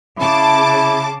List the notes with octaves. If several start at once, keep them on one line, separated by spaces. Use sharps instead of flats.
C#3 E4 A5 D6